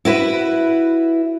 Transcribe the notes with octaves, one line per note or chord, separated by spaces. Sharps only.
E4 F#4 B4